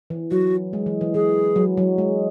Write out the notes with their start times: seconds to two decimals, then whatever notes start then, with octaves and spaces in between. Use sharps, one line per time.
0.10 E3
0.31 F#3 F#4
0.73 G#3
0.86 E3
1.01 E3
1.14 E3 G#4
1.56 F#3
1.77 F#3
1.98 G#3